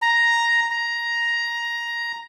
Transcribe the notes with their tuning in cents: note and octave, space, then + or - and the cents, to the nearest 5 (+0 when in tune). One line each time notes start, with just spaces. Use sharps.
A#5 +5
A#5 +10